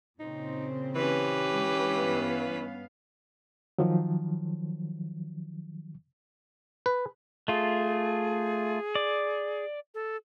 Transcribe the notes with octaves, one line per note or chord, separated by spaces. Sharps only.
A#2 C#3 C4 D#4
E3 C#4 G4 B4
D3 G#3
G2 B3 F5
D#3 F3 F#3
B4
A3 F4 G#4
D5
A4